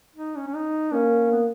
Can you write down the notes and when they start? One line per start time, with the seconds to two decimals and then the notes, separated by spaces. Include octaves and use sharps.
0.16 D#4
0.36 C#4
0.47 C#4
0.55 D#4
0.93 A#3 C#4
1.32 B3